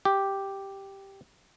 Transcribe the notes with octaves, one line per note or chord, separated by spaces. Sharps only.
G4